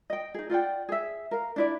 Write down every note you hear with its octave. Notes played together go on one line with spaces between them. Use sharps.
D#5 G5
D#4 G#4
F4 D5 F#5 G5
G#4 E5
A#4 F5
D4 E4 D5